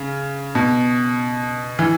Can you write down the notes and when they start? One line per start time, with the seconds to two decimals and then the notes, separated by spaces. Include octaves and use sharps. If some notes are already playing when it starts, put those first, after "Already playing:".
Already playing: C#3
0.55 B2
1.79 E3